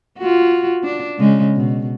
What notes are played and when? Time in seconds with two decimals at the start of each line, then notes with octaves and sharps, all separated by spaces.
0.18 F4 F#4
0.84 D4
1.19 C#3 G#3
1.56 B2